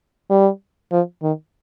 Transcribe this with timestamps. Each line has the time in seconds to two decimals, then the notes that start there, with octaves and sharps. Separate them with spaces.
0.30 G3
0.92 F3
1.22 D#3